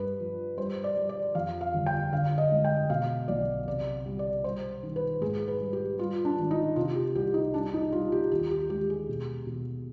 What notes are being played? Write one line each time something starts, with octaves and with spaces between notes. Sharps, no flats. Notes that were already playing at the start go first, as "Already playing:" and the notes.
Already playing: G2 B4
F3
G3 C5
D5
G3
D5
F2 F5
F5
G1
G5
D3 F5
D#5
G#3
G5
B2 F5
B1 D5
C3 D5
G3
D5
G3 C5
D#3
B4
G#2 G#4
B4
G3
G4
G3 F4
D4
G#1
D#4
C3 F4
G4
C2 G4
D#4
G3 D4
D#4
G3 F4
G4
D#2 G4
G4
G#3 G4
G#4
B2
B2